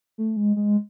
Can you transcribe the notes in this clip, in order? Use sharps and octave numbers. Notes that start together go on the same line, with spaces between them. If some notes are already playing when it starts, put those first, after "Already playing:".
A3
G#3
G#3